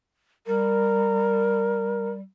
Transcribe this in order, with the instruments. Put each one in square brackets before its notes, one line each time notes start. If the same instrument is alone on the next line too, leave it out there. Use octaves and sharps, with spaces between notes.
[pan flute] G3 [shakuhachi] A#4